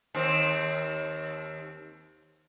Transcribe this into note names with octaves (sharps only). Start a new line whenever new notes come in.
D#2 C4